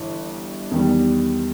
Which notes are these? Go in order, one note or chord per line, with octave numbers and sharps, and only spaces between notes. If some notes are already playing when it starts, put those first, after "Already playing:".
Already playing: G1 G2 E3
E2 D#3 G3